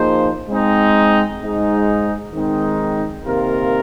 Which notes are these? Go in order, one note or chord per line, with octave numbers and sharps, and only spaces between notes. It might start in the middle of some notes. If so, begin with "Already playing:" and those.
Already playing: F3 A#3 D#4 G#4 C5
G#3 C4 D#4
G#2 G#3 D#4
D#3 G#3 C4 D#4
C3 D#3 A#3 F4 A#4